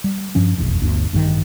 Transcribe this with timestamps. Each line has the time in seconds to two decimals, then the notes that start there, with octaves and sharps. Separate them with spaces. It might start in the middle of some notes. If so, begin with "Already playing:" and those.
0.04 G3
0.35 G2 F3 C#4
0.58 F1 B1 E2
0.82 G1 D2
1.13 A1 G2 A#2 D#3